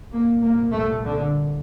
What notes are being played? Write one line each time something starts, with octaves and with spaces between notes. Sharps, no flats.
C2 A#2 A#3
A#3
A3
D3